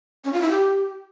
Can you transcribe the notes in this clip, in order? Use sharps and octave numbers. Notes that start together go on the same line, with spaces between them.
C#4
F4
E4
G4